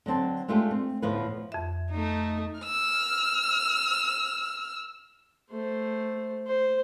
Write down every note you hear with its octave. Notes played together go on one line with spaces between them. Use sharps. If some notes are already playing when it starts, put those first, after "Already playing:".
D3 F#3 C4 A5
G#3 A3 D4 F4 G4 A4
C4
D2 A2 F3 B3 F4 B4
F2 E5
A3 D#4
E6 F6
A3 C5
C5